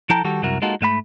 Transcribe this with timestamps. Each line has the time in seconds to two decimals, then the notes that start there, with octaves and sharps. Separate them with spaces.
0.10 F3 E4 A4 G5 A5 A#5
0.24 D#3 G3 F#4 G4 A4
0.43 C2 F#2 F#3 E4 F#4 A#4
0.62 G#3 A#3 D#4 F4 F#4 A4
0.81 G#2 A3 F5 B5